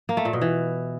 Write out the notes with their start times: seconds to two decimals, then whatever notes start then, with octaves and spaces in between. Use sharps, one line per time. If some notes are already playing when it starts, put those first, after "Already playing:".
0.09 A#3
0.17 A3
0.25 A#2
0.33 B2
0.41 E3